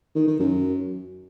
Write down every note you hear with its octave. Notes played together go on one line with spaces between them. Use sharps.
D#3
D#3
F#2